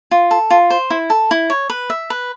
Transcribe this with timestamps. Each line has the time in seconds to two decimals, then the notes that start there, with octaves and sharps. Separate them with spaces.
0.11 F4
0.31 A4
0.51 F4
0.70 C5
0.90 E4
1.10 A4
1.31 E4
1.50 C#5
1.70 B4
1.90 E5
2.10 B4